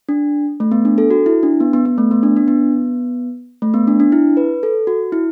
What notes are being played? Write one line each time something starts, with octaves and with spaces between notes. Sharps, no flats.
D4
A3
B3
D4
A4
F#4
E4
D4
B3
B3
B3
A3
B3
D4
D4
B3
A3
B3
D4
D4
E4
B4
A4
F#4
E4